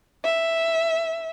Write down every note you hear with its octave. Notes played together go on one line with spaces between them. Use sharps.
E5